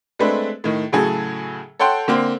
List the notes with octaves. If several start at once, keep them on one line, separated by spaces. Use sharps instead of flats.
G#3 A3 C4 D4 B4
A2 D#3
A2 C#3 F#3 G#4 A4
A4 C#5 F#5 G5 C6
D3 A#3 C4